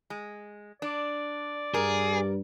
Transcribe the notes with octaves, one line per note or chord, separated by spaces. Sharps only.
G#3
D4 D5
G2 G#4 A#4